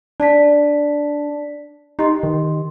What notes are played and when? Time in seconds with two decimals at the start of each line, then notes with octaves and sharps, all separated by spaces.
0.20 D4 D5 A5 B6
1.99 D#4 G4 D#5 C6
2.23 D#3